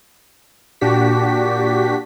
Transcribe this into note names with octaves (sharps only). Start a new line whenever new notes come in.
A#2 D4 F#4 G4 B6